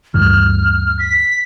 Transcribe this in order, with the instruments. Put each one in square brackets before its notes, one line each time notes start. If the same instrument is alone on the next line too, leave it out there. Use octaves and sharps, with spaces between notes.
[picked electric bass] D2 G2 E3 [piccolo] F6
[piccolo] B6